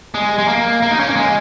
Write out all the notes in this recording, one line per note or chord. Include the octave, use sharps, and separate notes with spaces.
G#3
G#3
A#3
A#3
D#4
C#4
A#3
G#3